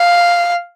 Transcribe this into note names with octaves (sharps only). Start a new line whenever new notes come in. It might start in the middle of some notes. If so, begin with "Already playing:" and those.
Already playing: F5